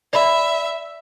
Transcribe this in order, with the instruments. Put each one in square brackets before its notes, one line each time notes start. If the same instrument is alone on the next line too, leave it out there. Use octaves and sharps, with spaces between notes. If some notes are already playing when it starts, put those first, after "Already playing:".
[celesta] D5 B5 [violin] E5